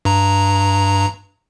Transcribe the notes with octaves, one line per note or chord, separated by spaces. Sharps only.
G2 A#5